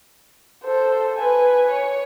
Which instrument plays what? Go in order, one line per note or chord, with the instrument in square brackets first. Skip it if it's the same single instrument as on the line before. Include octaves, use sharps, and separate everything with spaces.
[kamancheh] A4 C5
B4 G#5
C#5